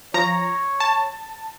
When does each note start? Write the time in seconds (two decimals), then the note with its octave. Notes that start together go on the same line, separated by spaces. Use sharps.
0.14 F3 C#5 A#5
0.80 A5